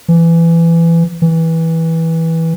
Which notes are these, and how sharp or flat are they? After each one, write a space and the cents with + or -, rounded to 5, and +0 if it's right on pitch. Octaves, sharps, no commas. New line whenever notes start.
E3 +20
E3 -15